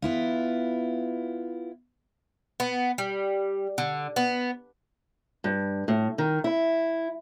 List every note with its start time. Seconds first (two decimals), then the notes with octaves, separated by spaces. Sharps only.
0.02 B3 E4 F4
2.60 B3
2.98 G3
3.78 D3
4.16 B3
5.44 G2
5.88 A2
6.18 D#3
6.44 E4